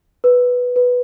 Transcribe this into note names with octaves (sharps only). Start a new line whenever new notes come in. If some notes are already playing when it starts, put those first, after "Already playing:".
B4
B4